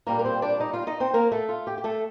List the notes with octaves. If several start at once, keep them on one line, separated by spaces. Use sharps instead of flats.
A#2 G3 A#3 D4 A#4
A#4
C4 C5
D4 D5
D#4 D#5
F4 F5
D#4 D#5
C4 C5
A#3 A#4
A3 A4
F4
G4
G4
A3 A4